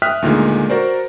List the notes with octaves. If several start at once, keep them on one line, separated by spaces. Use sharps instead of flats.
E5 G5 D#6 F6 F#6 B6
D2 A#2 D#3 G#3
F#4 A#4 C5 D5